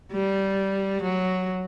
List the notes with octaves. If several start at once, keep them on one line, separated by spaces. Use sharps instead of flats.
G3
F#3